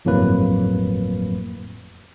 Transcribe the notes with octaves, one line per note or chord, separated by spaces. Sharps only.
G1 F2 A2 F#3 A#3 B4